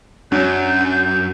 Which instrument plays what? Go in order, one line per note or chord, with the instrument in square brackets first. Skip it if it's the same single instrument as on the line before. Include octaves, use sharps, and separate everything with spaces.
[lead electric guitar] F#2 [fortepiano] F#3 [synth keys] C#4 D4 [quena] G6